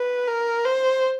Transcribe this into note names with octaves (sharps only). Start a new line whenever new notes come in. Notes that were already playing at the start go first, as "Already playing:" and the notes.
Already playing: B4
A#4
C5